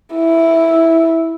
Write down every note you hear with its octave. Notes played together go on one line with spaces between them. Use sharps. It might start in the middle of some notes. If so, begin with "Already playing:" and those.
E4